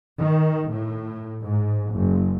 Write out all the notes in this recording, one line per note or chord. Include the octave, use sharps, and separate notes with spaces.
D#3
A2
G#2
F#1